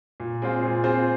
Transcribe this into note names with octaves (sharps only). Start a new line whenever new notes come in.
A#2
G#3 C4 F4 C5
A#2
G#3 C4 F4 C5